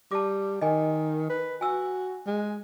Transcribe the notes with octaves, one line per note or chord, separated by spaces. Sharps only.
G3 A5 D6
D#3 D#5 G#5
B4
F#4 G#5 E6
G#3